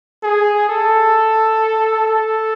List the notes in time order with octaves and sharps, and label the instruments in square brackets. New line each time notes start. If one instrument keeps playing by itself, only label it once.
[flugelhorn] G#4
A4
A4